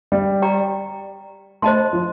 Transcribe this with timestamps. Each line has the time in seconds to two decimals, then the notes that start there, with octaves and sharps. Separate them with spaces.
0.12 G3
0.42 G4 D5 G5 A#5
1.62 A3 C5 D#5 A5 C6
1.93 F3